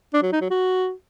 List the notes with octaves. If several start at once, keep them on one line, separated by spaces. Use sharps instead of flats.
D4
F#3
D#4
F#3
F#4